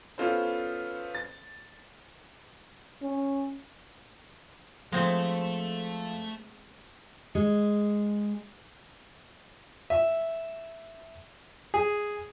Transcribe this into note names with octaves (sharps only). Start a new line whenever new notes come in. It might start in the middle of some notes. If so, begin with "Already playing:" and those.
B3 C#4 F4 A4 C5
A6
C#4
F3 G#3 A3 C4
G#3
E5
G#4